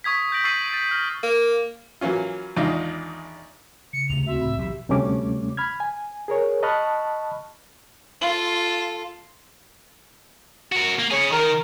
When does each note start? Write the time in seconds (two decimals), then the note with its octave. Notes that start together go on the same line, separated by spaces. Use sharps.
0.04 C#6 D#6 G#6 B6
0.32 G6 G#6 A#6 D7 F#7
0.44 C#6 E6 A6 C7 D#7 F#7
0.73 A6
0.91 F6 A#6
1.23 A#3
2.01 E3 F#3 A#3 C#4 F4
2.56 G#1 E2 D4 D#4 F4
3.93 C#3 C#7
4.09 C#2 C3 A3 F7
4.26 D2 C4 F#4 E5
4.41 A2 B5
4.58 B1 E3 F#3 G4
4.89 D2 C3 G3 A3 C#4 D6
5.57 B5 F6 G#6
5.80 G#5
6.28 G#4 A#4 C#5
6.63 D#5 A5 B5 C#6 F6 F#6
8.21 F4 A4
10.72 F#4 A#4
10.99 A#3
11.11 C#3 G#4 C#5
11.32 D#3 A#4